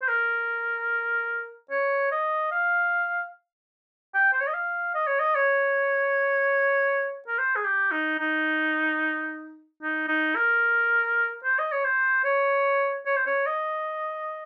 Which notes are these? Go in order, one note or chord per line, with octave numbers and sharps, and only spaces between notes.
C5
A#4
C#5
D#5
F5
G5
C5
C#5
D#5
F5
D#5
C#5
D#5
C#5
A#4
C5
G#4
G4
D#4
D#4
D#4
D#4
A#4
C5
D#5
C#5
C5
C#5
C#5
C5
C#5
D#5